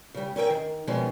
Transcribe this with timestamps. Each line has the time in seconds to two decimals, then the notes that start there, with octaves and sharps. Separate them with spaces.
0.14 C#3 G3
0.36 C#4 E4 A#4 G5
0.50 D#3
0.87 B2 D#3 F3 G#3 C#4